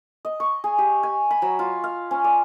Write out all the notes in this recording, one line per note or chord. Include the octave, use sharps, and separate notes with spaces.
D#5
C#6
G#4
G4
G#5
B5
F#3
F4
F5
C#4
D5